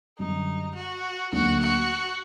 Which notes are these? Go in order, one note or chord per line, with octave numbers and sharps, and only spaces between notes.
F#2 D3 G3 D#4
F#4
D2 D3 F#3 A#3 D4 F#4
F#4